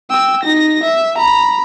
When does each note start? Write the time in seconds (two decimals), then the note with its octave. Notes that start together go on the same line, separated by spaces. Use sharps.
0.10 G5 E6
0.43 D#4 A#6
0.84 E5
1.18 A#5 B5